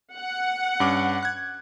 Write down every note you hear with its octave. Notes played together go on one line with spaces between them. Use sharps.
F#5
G2 C#4 D6
F#6 G#6